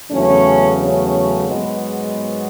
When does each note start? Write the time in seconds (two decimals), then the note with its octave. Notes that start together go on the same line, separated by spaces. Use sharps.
0.10 E2 C#3 F#3 A3 C#4
0.79 A3 C#4
1.48 G#2 F#3 G#3 B3